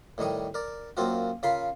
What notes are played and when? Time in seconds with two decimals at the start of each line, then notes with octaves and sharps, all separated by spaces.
0.18 A2 D#3 G3 C#6 D#6
0.54 A#4 D5
0.97 F#2 A#3 C4 F4 F#4
1.43 C#3 F4 A#4 B5 C6